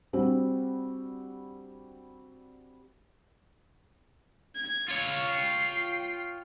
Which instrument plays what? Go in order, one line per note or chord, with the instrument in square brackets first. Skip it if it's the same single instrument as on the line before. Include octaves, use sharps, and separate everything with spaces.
[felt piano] G3 C4 D4 F#4
[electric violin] G#6
[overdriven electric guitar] F4 C#5
[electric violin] G5 C7